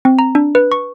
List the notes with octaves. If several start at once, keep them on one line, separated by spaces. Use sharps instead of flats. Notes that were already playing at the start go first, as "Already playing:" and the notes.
C4
A#5
D4
B4
C#6